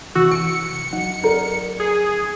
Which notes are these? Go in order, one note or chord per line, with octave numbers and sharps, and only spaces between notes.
C3 E3 F#4 E6
C#7 D7
F#3 D#4 F#5
A#4 D5
G#4